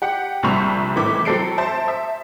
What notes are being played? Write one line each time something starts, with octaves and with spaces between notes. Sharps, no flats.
G4 F#5
A#1 C3 G3 C#6 F7
A2 D#3 E3 D6 B6
F#3 C4 A4 C7 D7
C5 E5 A5
E5